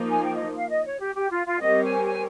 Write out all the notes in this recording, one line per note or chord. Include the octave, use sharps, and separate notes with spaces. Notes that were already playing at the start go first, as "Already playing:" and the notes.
Already playing: F3 A#3 D#4
G#5
G5
D#5
F5
D#5
C#5
G4
G4
F4
F4
G3 C4 G4 A#4 C#5 D#5
G#5
G#5